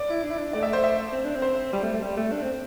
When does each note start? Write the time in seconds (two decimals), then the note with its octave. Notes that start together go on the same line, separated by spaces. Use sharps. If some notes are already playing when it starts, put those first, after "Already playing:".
Already playing: D5
0.09 E4
0.23 D4
0.31 E4
0.38 D4
0.53 A3 D5
0.63 E5
0.73 C5
0.84 E5
1.13 C4
1.24 D4
1.35 C4
1.42 C5
1.73 G3
1.82 A3
1.93 A3
2.02 G3
2.17 A3
2.32 D4
2.42 C4